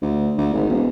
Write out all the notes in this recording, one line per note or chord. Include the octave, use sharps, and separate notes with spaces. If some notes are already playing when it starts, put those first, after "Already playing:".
D2
D2
G#1
E1